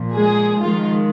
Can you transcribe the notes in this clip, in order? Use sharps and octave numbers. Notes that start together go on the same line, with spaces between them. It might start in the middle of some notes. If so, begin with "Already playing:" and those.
Already playing: A#2 F3
G#3 G#4
D#3 F3 F4
G#3